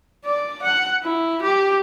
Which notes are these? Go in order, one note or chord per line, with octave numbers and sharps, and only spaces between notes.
D5
F#5
E4
G4